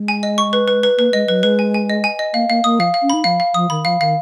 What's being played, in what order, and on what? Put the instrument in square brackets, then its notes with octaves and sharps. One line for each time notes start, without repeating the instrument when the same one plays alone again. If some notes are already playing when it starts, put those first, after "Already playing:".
Already playing: [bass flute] G#3
[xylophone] G#5
D#5
C#6
B4
B4
B4
[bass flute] A#3 [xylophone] B4
[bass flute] G#3 [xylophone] D#5
[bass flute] F#3 [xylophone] B4
[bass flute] G#3 [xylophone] B4
[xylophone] G#5
G#5
D#5
G#5
D#5
[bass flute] A#3 [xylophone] F5
[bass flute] A#3 [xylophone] F5
[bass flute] A#3 [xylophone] D#6
[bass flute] F3 [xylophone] F5
[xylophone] F5
[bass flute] C#4
[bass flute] D#4 [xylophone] B5
[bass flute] F3 [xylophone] F5
[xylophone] F5
[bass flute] F3 [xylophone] D#6
[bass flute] D#3 [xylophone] B5
[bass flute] F3 [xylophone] F5
[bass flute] D#3 [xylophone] F5